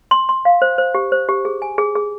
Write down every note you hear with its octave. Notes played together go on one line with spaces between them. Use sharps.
C6
C6
F5
C5
C5
G4
C5
G4
G#4
G#5
G#4
G#4